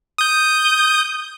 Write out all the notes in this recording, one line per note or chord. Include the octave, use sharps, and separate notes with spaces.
D#6 G6